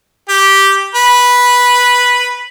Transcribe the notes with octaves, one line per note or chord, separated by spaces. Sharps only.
G4
B4